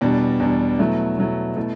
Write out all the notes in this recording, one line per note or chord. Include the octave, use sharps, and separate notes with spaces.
E2 B2 G3 D4
E2 B2 G3 D4
B2 F#3 A3 E4
B2 F#3 A3 E4
B2 A3 E4